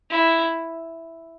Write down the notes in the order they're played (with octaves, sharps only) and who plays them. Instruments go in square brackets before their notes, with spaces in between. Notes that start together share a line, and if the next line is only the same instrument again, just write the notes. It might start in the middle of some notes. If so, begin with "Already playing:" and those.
[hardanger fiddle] E4